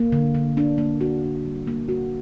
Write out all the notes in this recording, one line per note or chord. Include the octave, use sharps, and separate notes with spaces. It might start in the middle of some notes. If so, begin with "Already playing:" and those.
Already playing: A#3
D3
D3
D4
A#3
F#4
D4
G3
A#3
F#4